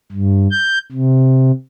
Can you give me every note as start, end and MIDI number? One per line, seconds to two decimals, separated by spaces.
0.12 0.47 43
0.51 0.78 91
0.92 1.51 48